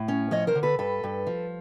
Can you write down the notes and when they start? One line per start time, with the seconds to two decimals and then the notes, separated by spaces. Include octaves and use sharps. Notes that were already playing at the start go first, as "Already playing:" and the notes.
Already playing: A2
0.08 C#4
0.31 F3 C#5 D#5
0.47 A#4 C5
0.55 D3
0.63 A4 B4
0.79 G2 A4 B4
1.04 G2
1.27 F3